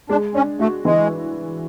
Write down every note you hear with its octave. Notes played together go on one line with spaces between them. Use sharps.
G#3 D4
C#4 D4
A3 F#4
E3 G#3